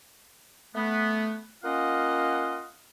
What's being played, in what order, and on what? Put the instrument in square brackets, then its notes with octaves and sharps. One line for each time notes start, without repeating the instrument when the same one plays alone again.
[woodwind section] A3 B3
A#3 C#4 F4 D#5 F5 F#5